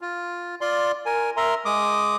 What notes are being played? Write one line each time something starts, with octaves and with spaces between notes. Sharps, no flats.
F4
F4 D5 C6
A#4 G#5
A#4 E5 A#5 C6
G#3 D6 D#6